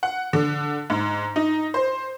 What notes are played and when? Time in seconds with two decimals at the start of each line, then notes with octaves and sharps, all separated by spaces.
0.03 F#5
0.33 D3
0.90 G#2
1.36 D#4
1.74 C5